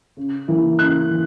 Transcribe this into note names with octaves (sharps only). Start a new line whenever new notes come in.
C#3
E3 A#3 E4
C#3 F#6
E3